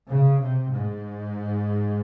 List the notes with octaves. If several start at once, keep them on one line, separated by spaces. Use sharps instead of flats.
C#3
C3
G#2